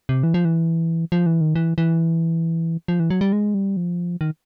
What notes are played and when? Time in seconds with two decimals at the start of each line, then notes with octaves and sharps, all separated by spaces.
0.09 C3
0.23 E3
0.34 F3
0.45 E3
1.12 F3
1.26 E3
1.41 D#3
1.55 E3
1.78 E3
2.88 F3
3.00 E3
3.10 F#3
3.21 G3
3.33 G#3
3.54 G3
3.77 F3
4.21 D#3